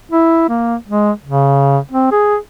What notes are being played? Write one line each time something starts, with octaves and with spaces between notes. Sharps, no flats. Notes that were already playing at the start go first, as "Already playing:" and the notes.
E4
A#3
G#3
C#3
C4
G#4